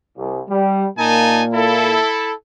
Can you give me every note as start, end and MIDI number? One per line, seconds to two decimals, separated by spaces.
0.18 0.40 36
0.49 0.86 55
0.98 1.98 46
0.98 1.98 58
0.98 1.44 63
0.98 1.44 80
0.98 1.44 81
1.53 2.32 64
1.53 2.32 69